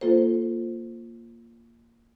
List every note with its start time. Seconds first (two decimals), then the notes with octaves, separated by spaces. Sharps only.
0.01 A#3 F4 A4 C5